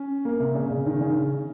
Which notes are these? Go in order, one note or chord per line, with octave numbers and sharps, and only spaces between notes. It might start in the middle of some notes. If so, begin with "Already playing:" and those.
Already playing: C#4
A#3
C3
C#3
C#3
D#3
C#3